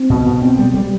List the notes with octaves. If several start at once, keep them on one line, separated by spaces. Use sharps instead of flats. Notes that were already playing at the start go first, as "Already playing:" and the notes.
Already playing: C4
B2
B2
C4
G3
G3